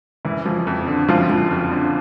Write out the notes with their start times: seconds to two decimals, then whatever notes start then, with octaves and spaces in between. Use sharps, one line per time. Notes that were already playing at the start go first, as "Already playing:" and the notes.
0.25 F#1 E3 E4
0.46 F3
0.67 F2
0.87 D3
1.09 F#1 F3 F4
1.30 F3
1.51 F2
1.72 D3